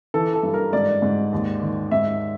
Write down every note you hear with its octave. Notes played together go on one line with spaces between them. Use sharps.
E3 A4
A4
G2
A#4
G#2 D5
G#2
D#2
D#3
G#2 E5